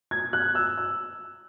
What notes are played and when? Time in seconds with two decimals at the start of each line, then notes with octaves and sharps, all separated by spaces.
0.11 G#6
0.33 F#6
0.55 E6
0.78 E6